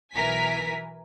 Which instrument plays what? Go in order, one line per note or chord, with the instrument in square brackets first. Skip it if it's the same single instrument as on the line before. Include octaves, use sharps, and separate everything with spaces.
[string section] B1 E3 A#4 G#5 B6